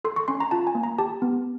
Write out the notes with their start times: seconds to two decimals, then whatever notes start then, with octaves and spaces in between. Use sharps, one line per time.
0.04 A4 C6
0.16 C#6
0.28 C#4 C6
0.40 A#5
0.51 F4 A5
0.67 G#5
0.75 A#3
0.83 A#5
0.98 G4 A5
1.22 B3